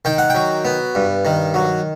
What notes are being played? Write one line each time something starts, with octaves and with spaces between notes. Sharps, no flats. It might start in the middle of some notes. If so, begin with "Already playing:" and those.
D#3 G5
F#5
F#3 G5
B3
G2
D#3
F#3